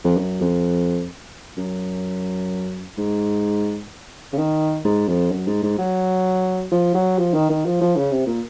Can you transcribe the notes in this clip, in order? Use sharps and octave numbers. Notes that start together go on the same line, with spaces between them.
F2
F#2
F2
F#2
G#2
C#3
D#3
G#2
F2
F#2
G#2
G#2
F#3
F3
F#3
F3
D#3
D#3
F3
F3
C#3
C3
A#2